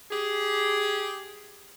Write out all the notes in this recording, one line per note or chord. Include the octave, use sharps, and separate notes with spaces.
G4 G#4